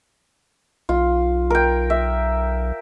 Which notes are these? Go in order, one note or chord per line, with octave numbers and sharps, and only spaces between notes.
B1 F4
A#4 G5
E5